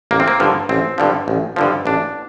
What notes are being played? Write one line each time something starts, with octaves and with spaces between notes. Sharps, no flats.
A1 A#3
C4
A#3
G2 D3 F3
A1 C4
G2 D3 F3
A1
G2 D3 F3
A1 D4